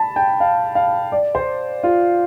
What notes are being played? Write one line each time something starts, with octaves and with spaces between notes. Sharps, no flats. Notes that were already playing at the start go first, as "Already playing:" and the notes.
Already playing: A5 B5
G5
F5
F5
D5
C5
F4